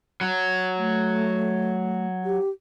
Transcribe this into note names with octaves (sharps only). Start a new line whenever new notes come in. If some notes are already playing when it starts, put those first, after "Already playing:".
F#3
A3
G4